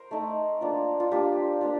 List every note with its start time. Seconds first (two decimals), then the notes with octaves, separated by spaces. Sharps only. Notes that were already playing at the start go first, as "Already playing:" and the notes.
Already playing: A#4 C5
0.11 A3 D#4
0.61 A#3 D4 F4
1.00 F4
1.12 A#3 D4 F4 G4
1.61 A#3 D4 F4